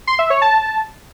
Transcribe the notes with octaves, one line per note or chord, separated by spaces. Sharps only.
C6
E5
C#5
A5